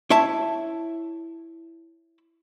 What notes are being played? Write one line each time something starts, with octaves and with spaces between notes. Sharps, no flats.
E4 C#5 E5 A5